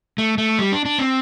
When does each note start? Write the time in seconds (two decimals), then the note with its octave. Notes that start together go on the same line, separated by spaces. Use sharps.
0.18 A3
0.38 A3
0.59 G3
0.72 D4
0.85 D4
0.98 C4